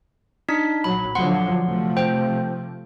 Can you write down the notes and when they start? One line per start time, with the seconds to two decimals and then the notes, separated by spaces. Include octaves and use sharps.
0.49 D4 D#4 B6
0.84 A#1 F#3 B5
1.15 D3 F3 F#3 F#5 C6
1.67 C3 F3 A3
1.97 C5 G5